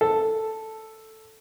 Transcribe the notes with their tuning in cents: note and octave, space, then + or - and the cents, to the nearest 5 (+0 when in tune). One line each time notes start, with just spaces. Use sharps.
A4 +0